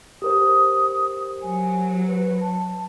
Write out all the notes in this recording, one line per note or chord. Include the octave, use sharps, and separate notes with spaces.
G4 A#4 C5 D#6
F#3 G#5
B4
A5